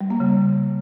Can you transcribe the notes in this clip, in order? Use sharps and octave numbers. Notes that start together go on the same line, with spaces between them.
G3
A#3
C#3